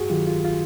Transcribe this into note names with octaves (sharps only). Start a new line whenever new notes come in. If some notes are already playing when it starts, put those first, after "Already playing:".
Already playing: G2 F#4 G#4
D#3 F#3 F4 G4
F4
F4